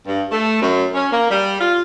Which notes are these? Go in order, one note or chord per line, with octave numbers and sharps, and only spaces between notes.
G2
A3
F#2
C#4
A#3
G3
F4